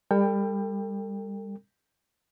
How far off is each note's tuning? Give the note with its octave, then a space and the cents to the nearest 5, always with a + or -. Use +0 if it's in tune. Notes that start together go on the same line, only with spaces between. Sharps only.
G3 +30 A4 +45 G5 +20